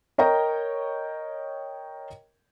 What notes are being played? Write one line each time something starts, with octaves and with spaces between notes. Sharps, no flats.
A#4 C#5 D#5 G5 A#5